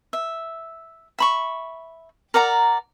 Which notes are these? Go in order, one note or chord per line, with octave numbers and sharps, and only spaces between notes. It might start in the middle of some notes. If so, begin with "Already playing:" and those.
E5
E5 B5 C#6
A#4 D5 F#5 A#5